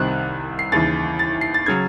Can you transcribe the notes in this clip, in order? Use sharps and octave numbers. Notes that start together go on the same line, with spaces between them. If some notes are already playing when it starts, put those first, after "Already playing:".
Already playing: C2 C3 D#3 F#6
C7
D#2 C#3 E3 A6
A6
C7
A6
C#3 F#3 G#6